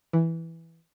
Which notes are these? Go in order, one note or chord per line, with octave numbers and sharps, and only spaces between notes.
E3